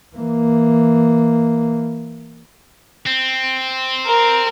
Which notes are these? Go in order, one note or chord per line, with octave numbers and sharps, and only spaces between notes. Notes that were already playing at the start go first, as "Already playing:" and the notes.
E3 A#3
C4
A#4